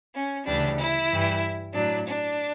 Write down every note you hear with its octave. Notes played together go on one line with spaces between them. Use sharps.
C#4
D2 C#3 E3 G3 D4
E4
G2 E3 G3
A2 F#3 D4
D4